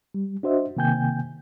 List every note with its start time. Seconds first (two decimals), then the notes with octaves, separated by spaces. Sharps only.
0.14 G3
0.43 D4 F#4 C5 D#5 E5
0.77 C3 D#3 A#3 G5 G#5 G6